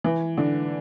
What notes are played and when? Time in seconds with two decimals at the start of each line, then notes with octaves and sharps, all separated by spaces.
0.04 E3
0.37 D3